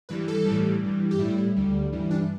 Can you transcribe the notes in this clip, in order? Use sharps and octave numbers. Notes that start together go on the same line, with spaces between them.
G2 E3 G3 B4
A4
A2 E3 G3
G2 E3 G3
G4
A2 G3 E4
D2 D3 G3
G2 E3 G3
D4